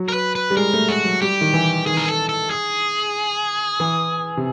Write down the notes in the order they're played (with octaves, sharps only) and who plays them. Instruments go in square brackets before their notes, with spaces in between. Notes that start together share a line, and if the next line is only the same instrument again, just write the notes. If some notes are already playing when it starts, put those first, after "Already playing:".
Already playing: [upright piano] F#3
[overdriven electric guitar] A#4
B4
B4
[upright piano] G3
[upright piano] G#3 [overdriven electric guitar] A#4
[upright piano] A3
[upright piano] G#3 [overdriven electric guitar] F#4
[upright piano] F#3
[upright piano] G3 [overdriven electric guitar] G4
[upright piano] D#3
E3
[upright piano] D#3 [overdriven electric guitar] G#4
[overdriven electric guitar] A#4
A4
A4
G#4
[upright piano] E3
C3